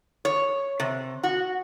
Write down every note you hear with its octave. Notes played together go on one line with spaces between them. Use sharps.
C#5
C3
F#4